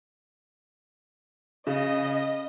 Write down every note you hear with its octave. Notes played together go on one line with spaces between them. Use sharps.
C#3 D#5